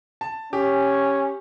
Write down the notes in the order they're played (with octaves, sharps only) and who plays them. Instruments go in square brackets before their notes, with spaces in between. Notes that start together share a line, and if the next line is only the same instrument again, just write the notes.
[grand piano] A5
[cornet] C#4 [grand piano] G4